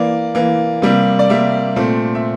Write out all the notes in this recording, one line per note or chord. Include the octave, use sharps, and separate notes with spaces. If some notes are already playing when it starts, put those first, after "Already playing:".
Already playing: E3 A#3 D5
E3 A#3
C3 G3 A#3
D5
C3 G3 A#3 E5
A#2 A3 C4
E5